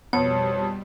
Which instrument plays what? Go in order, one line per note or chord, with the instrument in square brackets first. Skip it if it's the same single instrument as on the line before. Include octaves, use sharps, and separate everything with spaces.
[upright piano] F2 [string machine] B2 G3 [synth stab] B3 [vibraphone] C#5